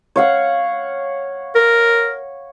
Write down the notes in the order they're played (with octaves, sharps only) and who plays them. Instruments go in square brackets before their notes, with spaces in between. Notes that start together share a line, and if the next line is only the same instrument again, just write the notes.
[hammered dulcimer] C#5 F5 F#5
[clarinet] A#4